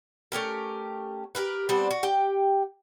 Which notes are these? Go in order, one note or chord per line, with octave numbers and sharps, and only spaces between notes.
A3 C#4 G4 A#4
G4 G#4 A#4 B4
G3 B3 C4 D4
F#4
G4 G5